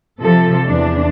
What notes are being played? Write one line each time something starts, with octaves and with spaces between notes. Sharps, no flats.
C3 F3 A4
E2 D4